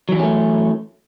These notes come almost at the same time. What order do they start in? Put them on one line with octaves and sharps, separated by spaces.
F#3 E3 G3 C#4 A3